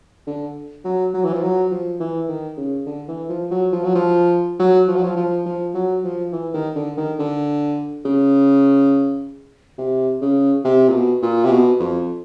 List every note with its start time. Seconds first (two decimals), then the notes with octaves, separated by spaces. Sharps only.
0.27 D3
0.84 F#3
1.14 F#3
1.24 E3
1.33 F3
1.42 F#3
1.71 F3
2.00 E3
2.28 D#3
2.57 C#3
2.86 D3
3.08 E3
3.29 F3
3.51 F#3
3.72 F3
3.84 F#3
3.95 F3
4.59 F#3
4.88 F3
4.96 F#3
5.03 F3
5.16 F3
5.45 F3
5.74 F#3
6.04 F3
6.32 E3
6.54 D#3
6.75 D3
6.97 D#3
7.19 D3
8.05 C#3
9.78 C3
10.21 C#3
10.64 C3
10.88 A#2
10.93 B2
11.22 A#2
11.44 C3
11.51 B2
11.80 F2